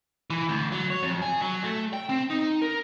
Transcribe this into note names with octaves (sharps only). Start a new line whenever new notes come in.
E3
D2
F#3
C#5
F2
G#4
F#3
A3
G5
C4
D#4
A#4